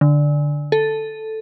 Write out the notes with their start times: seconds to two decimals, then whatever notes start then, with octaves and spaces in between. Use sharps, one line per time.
0.01 D3
0.72 A4